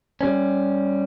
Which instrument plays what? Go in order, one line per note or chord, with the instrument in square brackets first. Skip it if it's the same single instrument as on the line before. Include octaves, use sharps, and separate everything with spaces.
[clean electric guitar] G3 C#4